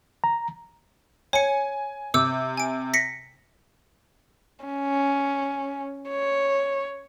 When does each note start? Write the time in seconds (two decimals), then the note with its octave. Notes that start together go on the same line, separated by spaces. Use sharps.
0.24 A#5
1.33 C#5 G#5 C#7
2.14 C3 D6 E6 G6
2.57 G#5 D7
2.94 A#6 B6 C#7
4.65 C#4
6.10 C#5